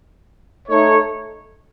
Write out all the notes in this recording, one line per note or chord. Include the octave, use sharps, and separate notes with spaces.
A3 D#4 A4 C#5